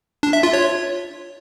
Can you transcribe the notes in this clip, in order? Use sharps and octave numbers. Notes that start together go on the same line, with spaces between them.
D4
E5
F4
C#5